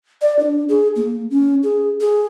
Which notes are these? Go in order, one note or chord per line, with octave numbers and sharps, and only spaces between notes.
D5
D4
G#4
A#3
C#4
G#4
G#4